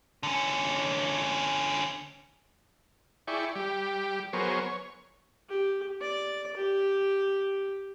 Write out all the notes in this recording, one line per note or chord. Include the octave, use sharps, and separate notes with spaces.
D3 C#4
E4 G#4 D5 G5 C#6
G3 G4
F#3 B3 G#4 A#4 C5 C#5
C#5
G4
D5
G4